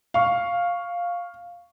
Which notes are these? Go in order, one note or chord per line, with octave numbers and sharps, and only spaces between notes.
F5 C#6